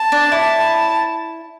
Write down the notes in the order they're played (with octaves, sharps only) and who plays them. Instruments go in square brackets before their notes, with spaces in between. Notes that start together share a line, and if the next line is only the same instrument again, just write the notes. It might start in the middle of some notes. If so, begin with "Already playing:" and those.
Already playing: [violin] A5
[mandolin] D4
E4